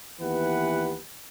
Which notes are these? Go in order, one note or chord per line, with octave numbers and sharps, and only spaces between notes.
D#2 E3 B3 G4 B4 F#5